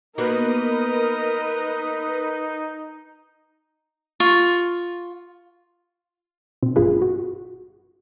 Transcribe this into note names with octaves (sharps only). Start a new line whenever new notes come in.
A#3 B3 D#4 F#4 A#4 B4 D#5
F4 C#6
B2 C4
G1 G2 F4 G#4 B4
F#4